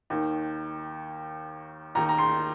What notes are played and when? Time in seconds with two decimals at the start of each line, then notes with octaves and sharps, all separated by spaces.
0.10 D#2 D#3
1.95 D#2 D#3 A#5
2.09 A#5
2.18 C6